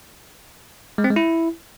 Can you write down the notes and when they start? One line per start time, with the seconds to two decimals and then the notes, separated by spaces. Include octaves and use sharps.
0.98 G#3
1.04 C4
1.10 G#3
1.16 E4